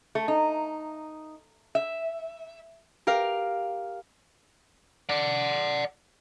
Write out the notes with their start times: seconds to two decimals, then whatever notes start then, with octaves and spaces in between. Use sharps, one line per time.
0.15 A3
0.28 D#4
1.75 E5
3.07 G4 A#4 F5
5.09 D5 F#5